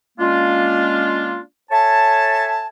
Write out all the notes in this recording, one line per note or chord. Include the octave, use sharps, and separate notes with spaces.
G#3 A#3 C#4 D4 F4
A4 C#5 E5 G#5 A5